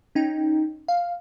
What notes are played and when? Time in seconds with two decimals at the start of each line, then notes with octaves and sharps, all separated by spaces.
0.15 C#4 D#4 G5
0.88 F5